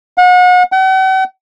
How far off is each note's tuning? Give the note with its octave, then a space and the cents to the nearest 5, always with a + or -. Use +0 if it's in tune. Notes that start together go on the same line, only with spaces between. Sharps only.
F#5 -35
F#5 +45